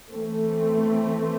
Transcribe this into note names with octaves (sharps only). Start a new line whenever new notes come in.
E3 A3 C4